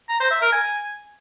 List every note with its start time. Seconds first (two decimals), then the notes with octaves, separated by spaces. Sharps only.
0.09 A#5
0.20 C5
0.31 E5
0.42 A#4
0.53 G#5